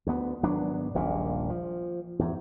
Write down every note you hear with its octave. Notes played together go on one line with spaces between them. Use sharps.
D2 B3
G#1 F#3 B3 D4
D#1 A#1 A#2
F3
E2 G#2